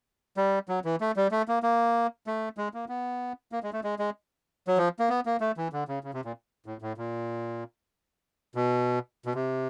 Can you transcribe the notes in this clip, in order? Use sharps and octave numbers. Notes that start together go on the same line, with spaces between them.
G3
F#3
E3
A3
G3
A3
A#3
A#3
A3
G#3
A#3
B3
A#3
G#3
A3
G#3
G#3
F#3
F3
A#3
B3
A#3
A3
E3
D3
C#3
C#3
C3
A#2
A2
A2
A#2
B2
B2
C3